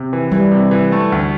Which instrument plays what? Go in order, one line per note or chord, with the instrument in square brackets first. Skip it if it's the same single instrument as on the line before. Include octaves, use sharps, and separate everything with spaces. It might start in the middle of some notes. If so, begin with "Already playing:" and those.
Already playing: [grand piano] C3
E3
[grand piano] E3 [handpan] G3
[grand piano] C3
E3
A3
D2